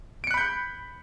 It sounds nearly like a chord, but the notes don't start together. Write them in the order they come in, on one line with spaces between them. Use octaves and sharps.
D7 C#7 F#6 B5 G6